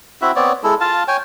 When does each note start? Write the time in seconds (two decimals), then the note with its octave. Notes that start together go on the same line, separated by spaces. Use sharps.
0.22 C4 E4 F#4 E5
0.36 B3 C4 C#5 D5
0.63 G#3 E4 A4
0.81 F4 F5 A5
1.08 C#5 G5 G#5